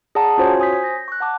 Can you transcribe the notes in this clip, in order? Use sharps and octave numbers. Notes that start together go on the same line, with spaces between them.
G#4 D5 F#5 A5 A#5 D#6
C#4 F4 F#4 C5 C#5 G#5
C5 G#5 D#6 G6 B6
G6 A#6
C#6 F#6
F#5 A5 D6